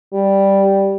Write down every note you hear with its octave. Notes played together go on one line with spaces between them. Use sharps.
G3